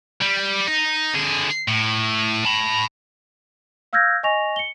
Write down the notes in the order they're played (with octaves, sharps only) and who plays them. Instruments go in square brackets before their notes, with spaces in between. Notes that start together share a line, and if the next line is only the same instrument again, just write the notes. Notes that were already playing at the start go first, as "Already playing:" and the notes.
[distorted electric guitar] G3
D#4
D3 G#4
A2
A5 B5
[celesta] F5 E6 F6 G6 G#6 A#6
D#5 G#5 C#6 A#6 F7
C#7 G7